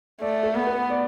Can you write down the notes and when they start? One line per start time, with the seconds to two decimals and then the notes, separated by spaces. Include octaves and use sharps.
0.21 A3 D5
0.43 A4
0.55 B3
0.67 B4
0.90 D5